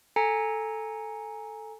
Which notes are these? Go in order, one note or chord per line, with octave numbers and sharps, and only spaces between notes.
A4 G#5 A#5 C#7